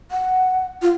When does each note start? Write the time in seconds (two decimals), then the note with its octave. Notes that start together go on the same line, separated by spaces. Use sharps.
0.11 F#5
0.82 F4